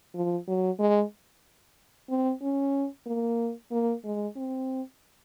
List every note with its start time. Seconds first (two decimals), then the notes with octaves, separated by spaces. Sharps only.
0.15 F3
0.48 F#3
0.79 G#3
2.10 C4
2.42 C#4
3.07 A#3
3.71 A#3
4.05 G#3
4.36 C4